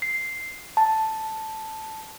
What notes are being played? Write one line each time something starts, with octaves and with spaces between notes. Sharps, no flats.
C7
A5